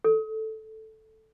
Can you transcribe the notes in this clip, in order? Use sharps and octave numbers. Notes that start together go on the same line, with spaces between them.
A4